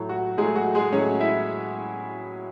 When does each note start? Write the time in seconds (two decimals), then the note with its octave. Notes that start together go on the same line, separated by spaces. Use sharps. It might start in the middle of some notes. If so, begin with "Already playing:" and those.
Already playing: A2 F#3 A3
0.09 F#4
0.38 A2 F#3 G#3 A3 G#4
0.56 F#4
0.75 G#3 G#4
0.93 A2 F#3 A3 C#4 C#5
1.20 E4 E5